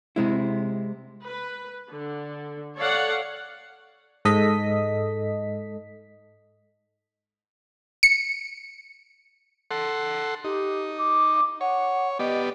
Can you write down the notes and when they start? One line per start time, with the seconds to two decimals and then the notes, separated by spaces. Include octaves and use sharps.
0.16 C3 G#3 E4
1.24 B4
1.92 D3
2.77 A4 C#5 D5 F5 F#5
4.25 G#2 A4 D#5 B6
8.03 C#7
9.71 A4 F#5 C6
10.44 D#4 G4
10.98 D6
11.61 C#5 F#5
12.19 B3 G4 D5 D#5